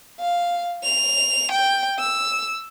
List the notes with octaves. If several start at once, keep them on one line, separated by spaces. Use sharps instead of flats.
F5
F7
G5
E6